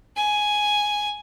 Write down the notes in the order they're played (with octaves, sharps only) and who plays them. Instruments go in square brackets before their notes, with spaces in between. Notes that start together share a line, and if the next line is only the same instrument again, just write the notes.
[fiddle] G#5